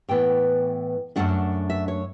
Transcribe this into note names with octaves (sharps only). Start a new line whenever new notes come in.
A2 E3 B3 G5
F#2 D3 A3 D4 F#5
E5
C#5